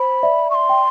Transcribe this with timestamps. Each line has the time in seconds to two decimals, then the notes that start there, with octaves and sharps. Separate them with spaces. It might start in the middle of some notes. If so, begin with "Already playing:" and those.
Already playing: C5 B5
0.23 D5 E5
0.50 C#6
0.55 C6
0.69 G5